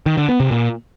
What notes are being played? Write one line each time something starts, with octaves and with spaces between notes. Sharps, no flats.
D#3
D3
B3
C3
A#2